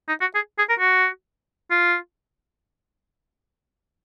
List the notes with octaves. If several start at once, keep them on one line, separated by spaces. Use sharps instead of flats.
D#4
F#4
G#4
G#4
A#4
F#4
F4